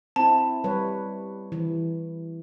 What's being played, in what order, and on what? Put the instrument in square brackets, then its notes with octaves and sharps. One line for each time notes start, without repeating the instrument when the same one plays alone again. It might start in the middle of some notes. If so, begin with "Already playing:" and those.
[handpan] C4 E4 [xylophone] A5
[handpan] G3 B4 C#5
E3